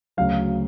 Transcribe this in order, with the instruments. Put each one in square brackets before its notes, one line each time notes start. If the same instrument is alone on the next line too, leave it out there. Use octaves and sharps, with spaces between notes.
[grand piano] D2 C#3 F#3 F5